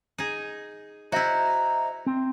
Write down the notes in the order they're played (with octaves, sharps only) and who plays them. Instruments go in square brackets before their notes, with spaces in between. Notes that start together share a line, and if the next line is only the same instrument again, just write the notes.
[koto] D#4 G#4
[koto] E4 F#4 [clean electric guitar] C5 D#5 E5 [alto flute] A#5
[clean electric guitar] C4